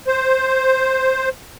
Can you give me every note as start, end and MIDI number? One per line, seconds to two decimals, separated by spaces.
0.07 1.29 72